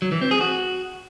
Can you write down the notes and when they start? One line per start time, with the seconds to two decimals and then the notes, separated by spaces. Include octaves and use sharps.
0.02 F#3
0.12 E3
0.21 C4
0.31 G#4
0.41 F#4